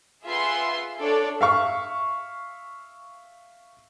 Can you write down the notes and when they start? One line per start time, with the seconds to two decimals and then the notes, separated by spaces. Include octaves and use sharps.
0.25 F4 G#4 B4 E5 F#5 C6
1.00 D4 A4 C#5 D5
1.41 E5 F5 C#6